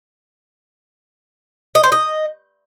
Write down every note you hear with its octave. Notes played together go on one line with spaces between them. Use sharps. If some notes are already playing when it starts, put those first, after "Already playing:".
D#5
C5
D#5